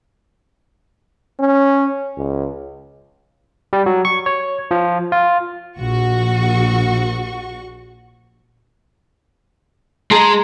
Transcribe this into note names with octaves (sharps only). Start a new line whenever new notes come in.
C#4
C#2
G3
F#3
C#6
C#5
F3
F4
A#1 F#4 C#6
G#3 G#4 A5 A#5 C6